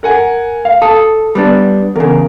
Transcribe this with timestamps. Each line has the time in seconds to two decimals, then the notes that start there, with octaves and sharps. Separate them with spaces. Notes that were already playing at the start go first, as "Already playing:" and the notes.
0.03 A#4 F#5 G#5
0.65 F5
0.82 A4 D#6
1.35 G3 B3 D4
1.96 E2 C#3 A#4